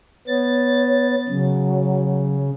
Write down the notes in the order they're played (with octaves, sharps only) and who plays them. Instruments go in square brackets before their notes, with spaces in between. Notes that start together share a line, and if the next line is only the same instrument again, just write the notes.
[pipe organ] B3 A6 [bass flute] C#5
[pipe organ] C#3 [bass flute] F#3